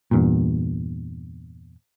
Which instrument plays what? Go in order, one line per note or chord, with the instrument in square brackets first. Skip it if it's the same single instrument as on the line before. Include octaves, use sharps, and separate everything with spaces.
[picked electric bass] E2 G2 A#2